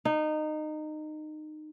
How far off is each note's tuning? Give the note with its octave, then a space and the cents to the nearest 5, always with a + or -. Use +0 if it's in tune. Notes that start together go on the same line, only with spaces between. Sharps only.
D#4 -20